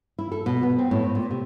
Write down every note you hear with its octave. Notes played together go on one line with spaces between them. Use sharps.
E4
A4
B2
B3
C4
A2
C4
A#2
C3